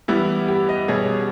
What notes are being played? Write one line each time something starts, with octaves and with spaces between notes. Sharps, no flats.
E3 G3 B3 E4
G4
D#5
B2 G3 C#4 G#4